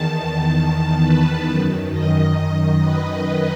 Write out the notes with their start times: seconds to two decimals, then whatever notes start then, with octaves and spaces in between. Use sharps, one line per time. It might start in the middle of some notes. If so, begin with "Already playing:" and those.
Already playing: E2 D#3 A5
0.14 A5
1.03 B4
1.48 F#2 D#3
1.93 D#5
2.38 D#5
2.83 B4